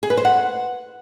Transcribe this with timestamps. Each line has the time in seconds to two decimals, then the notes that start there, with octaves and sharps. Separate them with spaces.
0.03 G#4
0.10 B4
0.17 C5
0.25 F#5